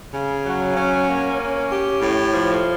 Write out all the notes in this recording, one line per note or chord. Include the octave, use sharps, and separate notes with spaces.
C#3
F#3
C#4
A#3
C#4
G4
A2
F3